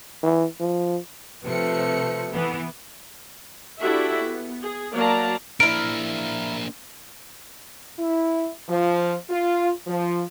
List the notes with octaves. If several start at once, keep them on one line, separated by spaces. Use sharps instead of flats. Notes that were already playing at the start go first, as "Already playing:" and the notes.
E3
F3
C3 F3 A3 B4 C#7
E3 B3
D4 E4 F#4 G4 A4 E5
B3
G#4
F#3 A#3 D5 F5 A5 A#5
A#3 D4 E4 A#4 D7
E4
F3
F4
F3